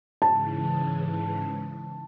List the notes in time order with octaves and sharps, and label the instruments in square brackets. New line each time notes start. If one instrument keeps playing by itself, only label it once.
[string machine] G#2 C#3 E3 [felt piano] A5